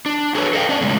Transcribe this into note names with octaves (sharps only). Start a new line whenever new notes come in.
D4
F#4 G#4 A4 B4 C#5
A4 D#5 F5 G5
C#4 D4
A2 C#3 G#3 A#3